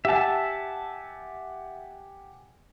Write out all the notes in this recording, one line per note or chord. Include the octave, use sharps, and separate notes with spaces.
G4 E5 F#5 G#5 A5